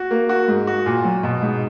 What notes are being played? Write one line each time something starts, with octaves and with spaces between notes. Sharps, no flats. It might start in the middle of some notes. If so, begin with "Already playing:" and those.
Already playing: F#4
A#3
F#4
G#2
F#4
A#2
F#3
B2
G#2